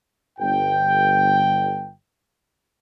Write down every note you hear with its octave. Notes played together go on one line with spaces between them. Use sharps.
G1 G5